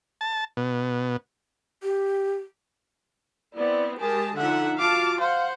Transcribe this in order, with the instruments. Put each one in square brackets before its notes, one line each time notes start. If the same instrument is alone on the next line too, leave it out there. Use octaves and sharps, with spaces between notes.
[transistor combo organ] A5
B2
[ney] G4
[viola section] B3 C4 E4 [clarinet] D5
[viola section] G#3 G4 A5 [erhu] G#4 [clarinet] A#4
[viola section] D3 F3 E5 [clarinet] D#4 [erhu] F#5
[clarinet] F4 [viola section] F#4 F5 A5 [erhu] D6
[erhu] C5 [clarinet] F5 [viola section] F#5